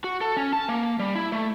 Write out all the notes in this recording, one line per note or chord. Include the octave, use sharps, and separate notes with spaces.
F#4
A4
C#4
A5
A#3
G3
E4
A3